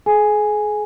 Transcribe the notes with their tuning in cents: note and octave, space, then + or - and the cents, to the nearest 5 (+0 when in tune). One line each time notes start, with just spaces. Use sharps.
G#4 +35 G#5 +0